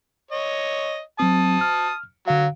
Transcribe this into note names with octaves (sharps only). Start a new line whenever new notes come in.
C#5 D#5
F#3 C4 A5 D#6
F6
D3 F#3 F5